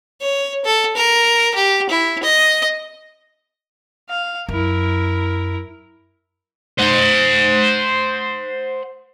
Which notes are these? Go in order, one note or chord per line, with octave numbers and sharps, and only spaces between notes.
C#5
A4
A#4
G4
E4
D#5
F5
F#2 E4 A#4
C5 F#5